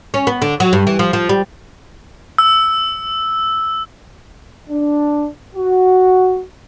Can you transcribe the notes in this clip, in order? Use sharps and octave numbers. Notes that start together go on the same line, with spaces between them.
C#4
B3
D3
F#3
G2
E3
F3
F3
G3
E6
D4
F#4